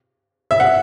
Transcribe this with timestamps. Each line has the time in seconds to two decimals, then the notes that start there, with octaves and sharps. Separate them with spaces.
0.51 E5
0.60 F#5